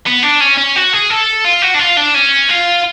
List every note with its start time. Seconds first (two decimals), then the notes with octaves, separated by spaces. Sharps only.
0.06 B3
0.23 D4
0.41 C#4
0.57 C#4
0.76 F#4
0.93 G#4
1.10 A4
1.45 F4
1.62 F#4
1.74 D4
1.79 F4
1.97 D4
2.14 C#4
2.49 F4